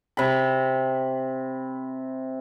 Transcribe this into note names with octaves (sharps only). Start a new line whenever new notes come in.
C3 B5